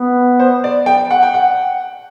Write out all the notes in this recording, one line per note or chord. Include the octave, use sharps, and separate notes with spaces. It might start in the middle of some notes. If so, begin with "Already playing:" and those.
Already playing: B3
C5
D5
G5
F#5
G5
F#5